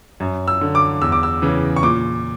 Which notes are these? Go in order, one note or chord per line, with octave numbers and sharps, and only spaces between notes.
F#2
E6
D3
D6
E2 E6
D6
E6
C#3 E3
C#6
A#2 D6